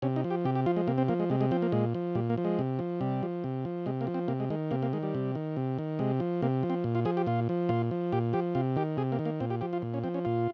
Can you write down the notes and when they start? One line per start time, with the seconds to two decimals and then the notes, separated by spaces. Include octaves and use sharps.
0.02 C3 C#4
0.16 D#4
0.24 F3
0.30 G4
0.45 C3 G4
0.55 G4
0.66 F3 F4
0.76 G#3
0.87 C3 A#3
0.98 C4
1.08 F3 A#3
1.20 G#3
1.30 C3 G#3
1.41 G#3
1.51 F3 C4
1.62 A#3
1.72 A#2 G#3
1.94 F3
2.15 A#2 G3
2.30 A#3
2.38 F3
2.45 G#3
2.59 C3
2.79 F3
3.01 C3 G3
3.23 F3
3.44 C3
3.65 F3
3.86 C3 G#3
4.01 A#3
4.07 F3
4.14 C4
4.28 C3 A#3
4.40 G#3
4.50 D#3 G#3
4.71 C3 A#3
4.82 A#3
4.93 D#3 G#3
5.03 G3
5.15 C3
5.35 D#3
5.57 C3
5.79 D#3
5.99 C3 G#3
6.20 F3
6.42 C3 A#3
6.63 F3
6.70 C4
6.84 A#2
6.95 F4
7.05 F3 G#4
7.17 G4
7.26 A#2 F4
7.49 F3
7.69 A#2 F4
7.91 F3
8.12 A#2 G4
8.33 F3 G4
8.55 C3 F4
8.76 D#3 G4
8.97 C3 G#4
9.12 A#3
9.19 D#3
9.25 A#3
9.40 A#2 C4
9.50 G4
9.61 F3 G4
9.73 F4
9.82 A#2
9.94 C#4
10.04 F3 C4
10.14 C#4
10.25 A#2 F4